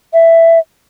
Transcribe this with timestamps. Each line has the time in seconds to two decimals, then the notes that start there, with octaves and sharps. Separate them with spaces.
0.13 E5